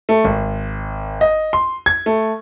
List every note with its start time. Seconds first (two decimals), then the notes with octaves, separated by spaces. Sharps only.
0.09 A3
0.24 G#1
1.21 D#5
1.53 C6
1.86 G#6
2.06 A3